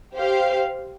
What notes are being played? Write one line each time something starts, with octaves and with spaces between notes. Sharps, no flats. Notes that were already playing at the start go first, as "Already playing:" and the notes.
G4 C5 F5